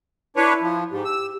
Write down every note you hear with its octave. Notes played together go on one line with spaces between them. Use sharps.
D4 E4 B4 C#5
F3
G#2 G4
E6